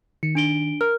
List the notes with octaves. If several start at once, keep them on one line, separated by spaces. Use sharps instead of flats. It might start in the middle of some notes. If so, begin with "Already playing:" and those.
D#3 C#7
D4 D7 G7
A#4 F6